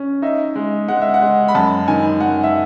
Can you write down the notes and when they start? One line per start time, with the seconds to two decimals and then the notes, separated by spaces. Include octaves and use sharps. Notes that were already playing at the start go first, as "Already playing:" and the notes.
Already playing: C#4
0.22 D#4 E5
0.56 G#3
0.88 G#3 F#5
1.01 E5
1.14 F#5
1.22 G#3
1.48 B5
1.55 F#2 A5
1.88 D#3 G#5
2.21 F#2 F#5
2.43 E5